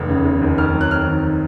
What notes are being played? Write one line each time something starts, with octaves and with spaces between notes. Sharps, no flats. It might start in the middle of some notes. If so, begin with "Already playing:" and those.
Already playing: F1 D#2
C#3
F1
D#2
F2 F6
F#3
F#6
F2 F6
D#3